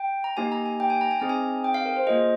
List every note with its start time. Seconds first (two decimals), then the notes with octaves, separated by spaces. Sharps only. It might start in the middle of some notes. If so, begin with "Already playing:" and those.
Already playing: G5
0.24 A#5
0.37 A#3 D#4 G4 G#5
0.52 A#5
0.65 G#5
0.80 G5
0.90 G#5
1.01 A#5
1.11 G#5
1.20 C4 D#4 G#4 A#5
1.29 G#5
1.64 G5
1.74 F5
1.86 A#4
1.96 C5
2.07 A#3 F4 G#4 D#5